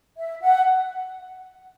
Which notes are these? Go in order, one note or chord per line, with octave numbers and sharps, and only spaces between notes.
E5
F#5